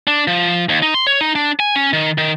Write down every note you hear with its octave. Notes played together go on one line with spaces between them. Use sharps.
D4
F3
D#2
D#4
C6
C#5
D#4
D4
G#5
C#4
D#3
D#3